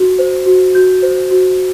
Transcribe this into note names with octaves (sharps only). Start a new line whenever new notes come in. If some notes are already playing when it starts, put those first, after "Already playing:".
Already playing: F#4
C5
F#4
F#4 G6
C5
F#4